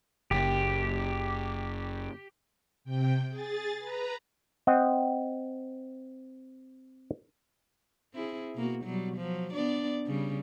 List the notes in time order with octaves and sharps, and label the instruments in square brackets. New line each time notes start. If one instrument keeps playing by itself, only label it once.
[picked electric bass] F#1 [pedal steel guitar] G4
[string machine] C3 G5
G#4 A6
B4 A#5
[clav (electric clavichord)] C4 D#5 F#5 G5
[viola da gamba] C4 E4 G#4
B2 A#3 F#4
B2 F#3 G3
F3 F#3
B3 D4 D5
C#3 G3